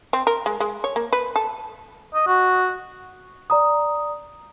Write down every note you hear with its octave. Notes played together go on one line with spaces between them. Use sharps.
C4
A#4
G#3
G#3
C#5
A#3
B4
A4
D#5
F#4
D5 A#5 D#6